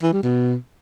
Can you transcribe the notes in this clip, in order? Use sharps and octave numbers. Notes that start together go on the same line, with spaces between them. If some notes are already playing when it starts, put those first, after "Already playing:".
E3
G3
B2